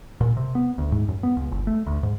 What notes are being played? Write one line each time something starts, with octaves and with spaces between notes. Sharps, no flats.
A#2
C3
B3
D2
G#2
F#2
B3
C#2
G1
A3
D2
G#2